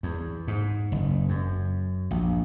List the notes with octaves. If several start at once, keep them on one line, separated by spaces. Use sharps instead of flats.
E2
G#2
F#1
F#2
A#1